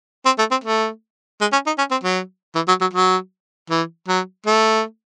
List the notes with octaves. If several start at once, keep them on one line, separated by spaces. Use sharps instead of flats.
C4
A3
C4
A3
G#3
C#4
D#4
C#4
C4
F#3
E3
F#3
F#3
F#3
E3
F#3
A3